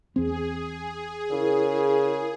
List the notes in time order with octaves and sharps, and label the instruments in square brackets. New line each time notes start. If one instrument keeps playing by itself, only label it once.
[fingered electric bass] E2 C4 [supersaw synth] G#4
[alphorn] C#3 [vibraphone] E4 A#4